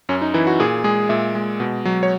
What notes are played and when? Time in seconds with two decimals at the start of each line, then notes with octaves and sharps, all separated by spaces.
0.09 F#2 C#4
0.22 D#4
0.34 E3 E4
0.47 F#4
0.60 A#2 G#4
0.84 G#3 G#4
1.09 A#2 E5
1.35 G#3
1.60 B2
1.85 F#3
2.03 C#5